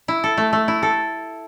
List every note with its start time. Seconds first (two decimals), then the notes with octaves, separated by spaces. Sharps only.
0.08 E4
0.24 A4
0.37 A3
0.53 A3
0.68 E4
0.83 A4